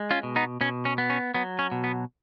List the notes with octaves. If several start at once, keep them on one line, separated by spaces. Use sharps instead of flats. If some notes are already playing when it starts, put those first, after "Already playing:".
Already playing: G#3
C#4 F4
B2
B3 D#4
B2 C#4
C#4
B3
C#4
F#3 B3
C#4
B2
B3